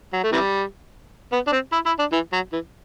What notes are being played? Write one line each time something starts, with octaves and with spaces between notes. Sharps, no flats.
F#3
A3
C3 E3 G3
B3
D4
C4
E4
E4
D4
E3
F#3
E3